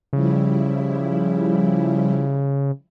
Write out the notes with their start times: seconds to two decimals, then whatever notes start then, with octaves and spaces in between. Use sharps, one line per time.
0.13 C#3 F3 G3 E4